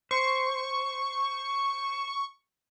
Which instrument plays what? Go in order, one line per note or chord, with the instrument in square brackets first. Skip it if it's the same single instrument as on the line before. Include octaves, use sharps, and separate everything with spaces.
[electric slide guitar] C5 [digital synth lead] C#6